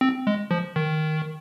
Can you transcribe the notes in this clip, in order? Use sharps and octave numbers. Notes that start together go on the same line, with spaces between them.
C4
G#3
F3
D#3